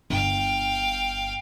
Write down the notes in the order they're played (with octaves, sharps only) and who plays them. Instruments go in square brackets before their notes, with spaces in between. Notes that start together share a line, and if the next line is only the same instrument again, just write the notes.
[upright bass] G1 [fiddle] F5 G5